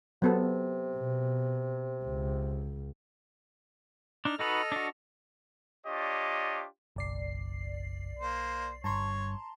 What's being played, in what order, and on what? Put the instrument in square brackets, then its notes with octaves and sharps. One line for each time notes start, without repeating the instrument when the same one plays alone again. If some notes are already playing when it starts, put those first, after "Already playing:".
[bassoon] C3 [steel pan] F#3 B3 A4
[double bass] B2
C#2
[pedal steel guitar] D4 D#4 [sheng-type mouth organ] F6
[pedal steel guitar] D#4 F#4 B4 [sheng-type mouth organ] A4 D#5 F6
[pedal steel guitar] D4 F#4
[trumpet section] D4 F4 G4 C#5 D#5
[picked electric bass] F#1 [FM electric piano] B1 D5 C7
[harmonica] A#3 C5
[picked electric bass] G1 G2 [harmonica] C#5 [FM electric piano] A5 A#5 C6